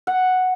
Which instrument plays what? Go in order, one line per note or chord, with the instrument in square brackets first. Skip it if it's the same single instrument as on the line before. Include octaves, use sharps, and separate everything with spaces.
[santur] F#5